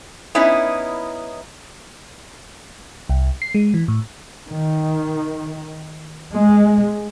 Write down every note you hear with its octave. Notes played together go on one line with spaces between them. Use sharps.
B3 C#4 D#4 E4
C2
C7
G#3
E3
A2
D#3
G#3